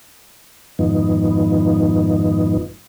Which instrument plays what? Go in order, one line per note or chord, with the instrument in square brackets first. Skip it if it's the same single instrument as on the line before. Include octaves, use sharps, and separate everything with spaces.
[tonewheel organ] F2 G#2 D#3 F3 B3 D#4